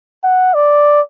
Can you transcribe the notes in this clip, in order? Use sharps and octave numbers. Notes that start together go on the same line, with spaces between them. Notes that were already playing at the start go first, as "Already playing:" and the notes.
F#5
D5